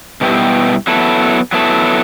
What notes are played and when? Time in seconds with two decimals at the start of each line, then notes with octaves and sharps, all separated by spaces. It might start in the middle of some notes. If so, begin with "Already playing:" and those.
0.21 B2 G3 B3 E4 G4
0.87 F#3 B3 E4 A4
1.52 F#3 B3 E4 A4